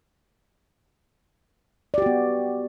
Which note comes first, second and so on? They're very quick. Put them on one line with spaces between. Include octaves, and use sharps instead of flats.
D5 G4 F#4 B3